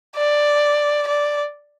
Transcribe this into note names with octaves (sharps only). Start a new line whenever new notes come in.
D5
D5